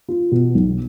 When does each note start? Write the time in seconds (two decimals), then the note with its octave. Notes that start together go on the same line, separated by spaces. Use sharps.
0.08 F4
0.31 B2
0.55 B1